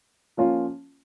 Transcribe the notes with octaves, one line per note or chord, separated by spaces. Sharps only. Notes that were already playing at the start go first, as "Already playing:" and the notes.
F3 A#3 C#4 F4